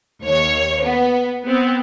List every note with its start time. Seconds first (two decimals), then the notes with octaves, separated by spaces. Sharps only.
0.23 D#2 C#5
0.82 B3
1.45 B3 C4